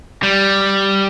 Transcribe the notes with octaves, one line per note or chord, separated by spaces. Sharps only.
G3